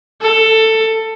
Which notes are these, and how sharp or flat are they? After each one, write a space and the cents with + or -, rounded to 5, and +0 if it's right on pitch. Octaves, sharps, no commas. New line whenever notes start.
A4 +15